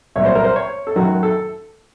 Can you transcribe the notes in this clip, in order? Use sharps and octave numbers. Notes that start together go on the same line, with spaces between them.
C2 A#2 F#3 C#5
C5
A#4
C5
C#5
A4
F#2 D#3 F#3 F#4
A4